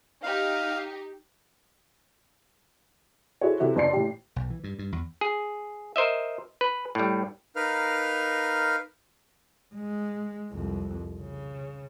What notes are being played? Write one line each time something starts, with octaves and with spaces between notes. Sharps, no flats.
D#4 G4 F5
E4 F#4 G#4 A4 C5 C#5
C3 E4 F#4 A4
F#1 D4 D5 C6 C7
A2 G4
B1
E3
G2
G2
E2
G#4
A#4 C5 D#5 E5
B4
A2 G3
D#4 A#4 B4 F5 F6
G#3
C2 F2
C#3